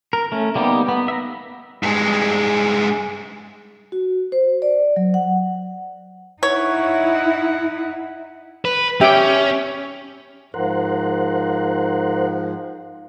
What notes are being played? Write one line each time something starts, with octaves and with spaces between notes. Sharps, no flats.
A#4
A3 C#4
G3 A#3 B3 D#4 G4
B3
E5 A#5
G2 G#3
F#4
C5
D5
F#3
F#5
D#4 E4 C#5 F#5
B4
C#4 G4 E5 G5
G#2 F3 A#4 C5 F#5